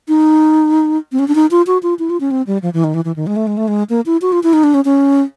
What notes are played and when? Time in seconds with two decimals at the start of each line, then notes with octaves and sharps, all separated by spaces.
0.08 D#4
1.12 C4
1.19 C#4
1.28 D4
1.35 D#4
1.51 F4
1.67 F#4
1.83 F4
1.99 E4
2.10 F4
2.20 C#4
2.31 C4
2.47 G3
2.62 F3
2.73 E3
2.84 D#3
2.94 E3
3.05 E3
3.16 D#3
3.27 G#3
3.36 A3
3.47 G#3
3.57 A3
3.68 G#3
3.90 A#3
4.06 E4
4.22 F#4
4.32 F4
4.43 E4
4.53 D#4
4.64 D4
4.74 C#4
4.85 C#4